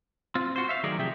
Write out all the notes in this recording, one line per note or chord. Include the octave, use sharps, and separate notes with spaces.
C4 F4
F#4 C5
E5 F5
D#3 F#3 A3 G#4 A#4 D5
C3 F3 G4 G#4 E5 G5